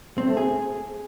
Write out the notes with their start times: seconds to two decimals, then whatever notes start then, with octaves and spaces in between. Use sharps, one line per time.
0.18 C4
0.27 A3
0.37 G#4